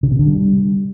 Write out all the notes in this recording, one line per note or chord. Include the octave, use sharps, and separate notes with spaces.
C#3
B2
D3
G3